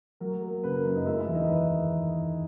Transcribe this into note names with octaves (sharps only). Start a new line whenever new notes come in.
F#3 A#4
A#3
C#3 B4
A#4
F#2
D#4 D#5
G#3 E4 E5
E4 E5
E2
D#4 D#5
D#3 B4